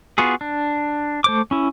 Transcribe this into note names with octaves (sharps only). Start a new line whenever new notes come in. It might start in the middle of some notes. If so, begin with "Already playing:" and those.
B3 F4 F#4 G#4
D4
A3 C5 D6
C#4 E4